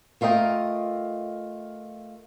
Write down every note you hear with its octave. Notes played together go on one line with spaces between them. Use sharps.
A3 F4 A#4 D#5 G5